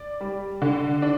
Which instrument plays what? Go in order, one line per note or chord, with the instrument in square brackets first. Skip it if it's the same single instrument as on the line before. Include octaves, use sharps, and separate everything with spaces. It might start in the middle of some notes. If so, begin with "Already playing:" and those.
Already playing: [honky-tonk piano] D5
G3
D3
D4